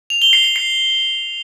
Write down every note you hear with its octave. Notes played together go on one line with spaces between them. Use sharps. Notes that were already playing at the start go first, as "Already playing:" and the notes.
F7
G7
C7
C7
C7